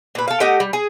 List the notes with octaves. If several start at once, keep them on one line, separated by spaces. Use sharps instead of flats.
A#2 B4
A4 F5
A3 G4 D#5 F#5
G3
G#4